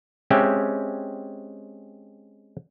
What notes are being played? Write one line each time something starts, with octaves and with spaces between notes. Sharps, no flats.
G#3 C4 C#4 G4 E5